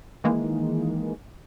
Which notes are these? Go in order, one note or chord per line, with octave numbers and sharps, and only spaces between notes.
D#3 E3 G#3 A#3 D#4